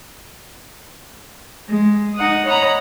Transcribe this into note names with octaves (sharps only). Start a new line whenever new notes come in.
G#3
D#4 F#5 D#6
C#5 D#5 F#5 A#5 B5